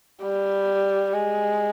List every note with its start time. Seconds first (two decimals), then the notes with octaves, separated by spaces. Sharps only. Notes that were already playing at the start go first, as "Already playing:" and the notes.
0.22 G3
1.13 G#3